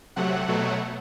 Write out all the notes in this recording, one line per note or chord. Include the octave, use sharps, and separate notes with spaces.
C3 F#3 A3 F#5
B2 F#3 A3